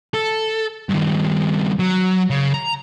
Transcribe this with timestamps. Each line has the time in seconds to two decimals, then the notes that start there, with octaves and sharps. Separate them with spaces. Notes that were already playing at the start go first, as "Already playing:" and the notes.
0.14 A4
0.89 G2 D#3
1.79 F#3
2.30 C#3
2.54 A#5